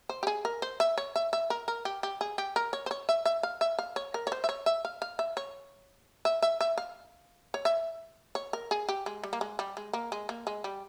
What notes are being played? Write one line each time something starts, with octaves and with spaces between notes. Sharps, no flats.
C5
G4
G#4
A#4
C5
E5
C#5
E5
E5
A#4
A#4
G4
G4
G#4
G4
A#4
C#5
C5
C#5
E5
E5
F5
E5
F5
C#5
A#4
C#5
C5
E5
C#5
E5
F5
F5
E5
C#5
E5
E5
E5
F5
C#5
E5
C#5
A#4
G#4
G4
G#3
G3
A#3
G#3
G3
G#3
A#3
G#3
A#3
G#3
G3